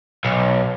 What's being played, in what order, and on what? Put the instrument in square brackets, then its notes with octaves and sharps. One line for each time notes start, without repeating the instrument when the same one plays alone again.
[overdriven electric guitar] B1